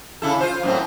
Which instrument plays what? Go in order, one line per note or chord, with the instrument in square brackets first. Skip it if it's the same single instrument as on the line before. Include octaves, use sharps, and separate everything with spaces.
[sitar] C#3 E4 A4
F4 C5
F#2 A2 C4